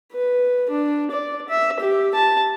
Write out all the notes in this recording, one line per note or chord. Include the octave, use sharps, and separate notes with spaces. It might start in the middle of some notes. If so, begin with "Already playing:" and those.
B4
D4
D5
E5
G4
A5